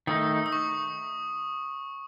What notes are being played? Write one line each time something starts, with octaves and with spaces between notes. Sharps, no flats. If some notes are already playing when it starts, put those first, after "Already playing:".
D#3 A3 D#4 D#6
D#6
C#6